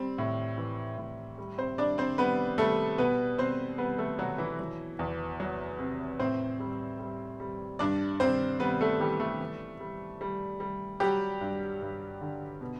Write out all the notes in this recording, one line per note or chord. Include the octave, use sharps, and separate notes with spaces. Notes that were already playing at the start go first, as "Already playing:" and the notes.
Already playing: G3 C4
A2
E3
A2
G3
C4 C5
G3 D4 D5
C4 C5
G3 B3 B4
G3 A3 A4
B2 B3 B4
B2 C4 C5
G3 B3 B4
A3 A4
B2 F#3 F#4
E3 E4
F#3
E2
F#3
C3
A2 C4 C5
G3
G3
G3
G2 D4 D5
G2 C4 C5
G3 B3 B4
A3 A4
E3 G3 G4
A3 A4
E3
G3
G3
G3
F#3 G3 G4
G2
G2
D3
B2